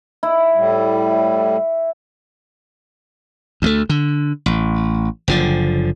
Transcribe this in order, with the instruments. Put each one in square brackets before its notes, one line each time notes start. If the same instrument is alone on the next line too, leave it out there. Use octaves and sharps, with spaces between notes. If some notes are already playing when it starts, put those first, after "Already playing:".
[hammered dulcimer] E4
[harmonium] A2 G3
[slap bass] D2 G3 A3
D3
A1
F#1 D3 F3